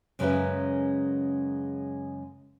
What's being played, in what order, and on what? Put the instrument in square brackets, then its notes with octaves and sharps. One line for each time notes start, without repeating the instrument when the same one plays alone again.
[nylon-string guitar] F#2 C#3 G#3 A#4 B4 E5